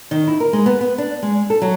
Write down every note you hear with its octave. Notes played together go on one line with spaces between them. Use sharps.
D#3
E4
A#4
G#3
B3
B3
D4
G#3
A4
F#3